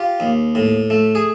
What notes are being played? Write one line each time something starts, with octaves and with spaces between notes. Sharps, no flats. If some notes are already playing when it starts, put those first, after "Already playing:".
Already playing: F4 G4
D#2
A2
A3
G#4